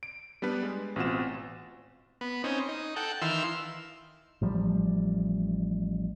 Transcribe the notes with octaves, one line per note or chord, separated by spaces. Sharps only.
D7
G3 B3 D4 B4
G#3
A1 B2 C4 F4 F#5 E7
B3
C4 C#4 D#4
D#4
A4 F#5 G5
D#3 E3 F5 C6 E6
A1 F3 G3